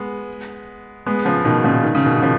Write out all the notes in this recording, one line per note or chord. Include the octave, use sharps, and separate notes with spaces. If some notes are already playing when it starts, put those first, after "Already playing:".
Already playing: G#3 B3
G#3 B3
C#3 F3
B2 D#3
A#2 C#3
D#3
C#3
B2 D#3
D#3
C#3 F3